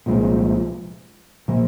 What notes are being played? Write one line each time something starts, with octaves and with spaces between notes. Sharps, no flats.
C2 A#2 F3 G#3
A#2 F3 A#3